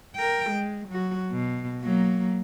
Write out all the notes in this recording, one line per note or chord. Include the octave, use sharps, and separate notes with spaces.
A#4 G5
G#3
F#3 F#4
B2
F#3 A#3